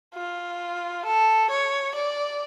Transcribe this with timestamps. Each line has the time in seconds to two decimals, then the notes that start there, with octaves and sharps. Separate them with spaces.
0.15 F4
1.05 A4
1.50 C#5
1.95 D5